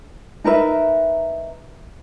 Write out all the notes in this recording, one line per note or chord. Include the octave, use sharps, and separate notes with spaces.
D#4 A#4 B4 E5